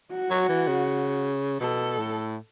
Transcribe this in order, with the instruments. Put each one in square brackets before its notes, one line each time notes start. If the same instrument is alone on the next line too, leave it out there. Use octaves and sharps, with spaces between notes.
[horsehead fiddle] F#4
[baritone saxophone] F#3
E3
C#3
[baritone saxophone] B2 [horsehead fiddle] A4
[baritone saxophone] A2